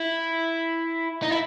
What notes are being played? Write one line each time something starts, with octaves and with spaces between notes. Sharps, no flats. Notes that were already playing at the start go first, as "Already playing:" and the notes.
Already playing: E4
D#4
E4